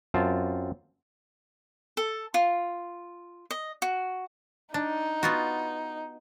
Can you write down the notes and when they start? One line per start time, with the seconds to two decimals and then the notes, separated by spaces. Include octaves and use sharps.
0.14 F#2 C4 F4 A5
1.97 A4
2.34 F4
3.51 D#5
3.82 F#4
4.74 D4 D#4
5.23 B3 F4 F#4